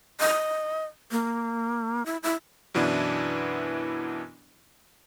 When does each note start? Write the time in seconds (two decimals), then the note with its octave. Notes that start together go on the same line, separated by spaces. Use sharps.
0.20 D#5
1.12 A#3
2.06 E4
2.23 E4
2.74 F#2 B2 E3 B3 D4 E4